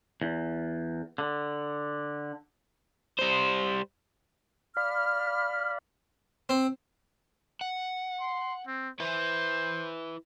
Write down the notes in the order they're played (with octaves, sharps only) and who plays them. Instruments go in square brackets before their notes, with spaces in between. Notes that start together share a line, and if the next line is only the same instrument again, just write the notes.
[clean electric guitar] E2
D3
[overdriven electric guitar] G3 C5
[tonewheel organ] D5 F5 B5 [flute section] F6
[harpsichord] C4
[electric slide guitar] F#5
[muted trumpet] C6
C4
[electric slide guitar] E4 B4 E5 [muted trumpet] C5